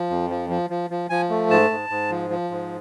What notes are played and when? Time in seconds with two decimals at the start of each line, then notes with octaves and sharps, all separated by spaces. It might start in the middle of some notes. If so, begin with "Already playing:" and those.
Already playing: F3
0.10 F2
0.30 F3
0.50 F3
0.70 F3
0.90 F3
1.10 F3 G#5
1.29 A3
1.50 G#2 A5
1.70 G#2
1.89 G#2
2.10 F3
2.30 F3
2.50 G#2